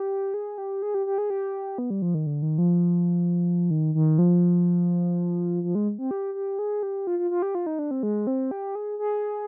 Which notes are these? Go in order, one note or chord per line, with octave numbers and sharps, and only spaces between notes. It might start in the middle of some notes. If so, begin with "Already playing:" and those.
Already playing: G4
G#4
G4
G#4
G4
G4
G#4
G4
B3
G3
F3
D#3
D3
D#3
F3
D#3
D#3
F3
F3
G#3
C4
G4
G4
G#4
G4
F4
F4
F4
G4
F4
D#4
D4
C4
G#3
C4
G4
G#4
G#4